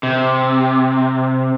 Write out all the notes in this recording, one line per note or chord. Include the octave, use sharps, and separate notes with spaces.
C3